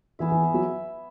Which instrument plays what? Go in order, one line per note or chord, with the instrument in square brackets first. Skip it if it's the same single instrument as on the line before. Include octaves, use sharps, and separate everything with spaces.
[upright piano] E3 [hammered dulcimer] B3 G#4 E5
[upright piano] E3
[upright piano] F#3 [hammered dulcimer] E5